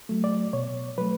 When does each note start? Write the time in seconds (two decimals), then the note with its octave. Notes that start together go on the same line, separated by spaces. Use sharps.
0.09 F#3 A3
0.24 D5
0.53 B2 C#5
0.98 F#3 A3 B4